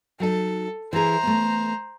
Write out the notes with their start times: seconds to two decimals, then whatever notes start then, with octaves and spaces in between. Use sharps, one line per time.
0.20 F#3 D#4 A4
0.93 E3 G#4 C5 A#5
1.23 A3 B3